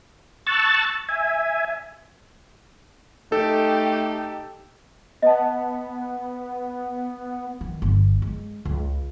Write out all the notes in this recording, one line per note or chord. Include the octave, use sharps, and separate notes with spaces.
A5 C#6 E6 F#6 A6
E5 G#5
A3 D#4 G4 A4
B3 D#5 A5
D#3
G1
G#3
C#2